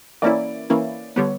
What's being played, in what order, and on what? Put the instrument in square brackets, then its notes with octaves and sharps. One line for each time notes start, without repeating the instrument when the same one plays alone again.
[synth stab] E3 A#3 C#4 E4 [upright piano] D5
[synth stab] E3 A#3 C#4 E4
[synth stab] D3 G3 B3 [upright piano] C#5